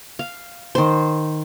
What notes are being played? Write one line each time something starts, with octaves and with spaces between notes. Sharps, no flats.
F5
D#3 C5